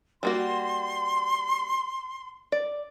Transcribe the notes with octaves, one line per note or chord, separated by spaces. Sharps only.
G3 A#3 F#4 C6
D5